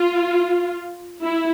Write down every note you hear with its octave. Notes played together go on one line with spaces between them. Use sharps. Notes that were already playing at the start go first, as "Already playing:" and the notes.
Already playing: F4
E4